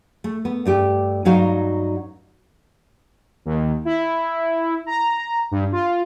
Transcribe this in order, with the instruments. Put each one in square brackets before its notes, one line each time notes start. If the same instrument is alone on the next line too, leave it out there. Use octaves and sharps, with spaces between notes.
[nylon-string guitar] A3
B3
G2 A3 G4
G2 F#3 D#4 F#4 F5
[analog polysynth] D#2
E4
A#5
G2
F4